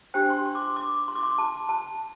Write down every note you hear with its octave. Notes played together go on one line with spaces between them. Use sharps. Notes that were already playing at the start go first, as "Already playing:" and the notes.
D4 G4 C5 G5
C6
C6
D6
C6
D6
C6
D6
C6
A5
A5